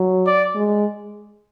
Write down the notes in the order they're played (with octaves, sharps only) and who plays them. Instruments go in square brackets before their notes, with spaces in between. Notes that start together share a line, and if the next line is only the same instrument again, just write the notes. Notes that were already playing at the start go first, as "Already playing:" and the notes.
Already playing: [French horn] F#3
[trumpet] D5
[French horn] G#3